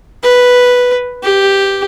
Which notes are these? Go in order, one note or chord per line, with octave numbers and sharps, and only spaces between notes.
B4
G4